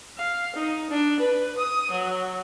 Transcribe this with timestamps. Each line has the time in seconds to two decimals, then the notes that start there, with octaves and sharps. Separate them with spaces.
0.18 F5
0.56 D#4
0.90 D4
1.19 B4
1.57 D#6
1.91 F#3